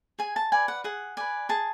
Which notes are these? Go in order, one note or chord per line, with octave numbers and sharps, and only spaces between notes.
G#4 G#5
A5
B4 D5 G#5
F#5
G#4 F#5
B4 D5 G#5
G#4 A5